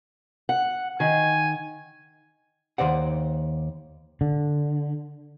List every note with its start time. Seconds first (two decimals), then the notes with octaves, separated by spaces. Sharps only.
0.49 F#5
1.00 D#3 G#5
2.78 D#2 C3 C5 D5 F#5
4.21 D3